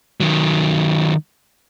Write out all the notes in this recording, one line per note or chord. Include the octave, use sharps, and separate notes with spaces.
D#3 F#3